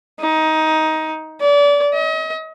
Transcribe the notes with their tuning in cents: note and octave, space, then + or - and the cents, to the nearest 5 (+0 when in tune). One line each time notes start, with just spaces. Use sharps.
D#4 +15
D5 -30
D#5 +40